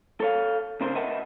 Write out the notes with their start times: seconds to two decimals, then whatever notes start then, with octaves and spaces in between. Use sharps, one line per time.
0.20 A4 C#5 F5
0.81 C#3 C4 D4 A#4 C5
0.95 A#4 B4 D#5 E5 F#5 A5